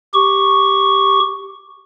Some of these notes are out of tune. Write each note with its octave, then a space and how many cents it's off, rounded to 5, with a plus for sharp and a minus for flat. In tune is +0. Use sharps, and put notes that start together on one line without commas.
G4 +0 C#6 +0